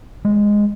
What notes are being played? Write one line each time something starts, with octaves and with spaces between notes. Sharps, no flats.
G#3